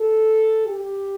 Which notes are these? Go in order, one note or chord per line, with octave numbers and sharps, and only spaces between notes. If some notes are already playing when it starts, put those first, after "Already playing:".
Already playing: A4
G4